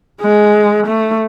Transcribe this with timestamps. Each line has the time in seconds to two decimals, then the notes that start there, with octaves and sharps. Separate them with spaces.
0.21 G#3
0.86 A3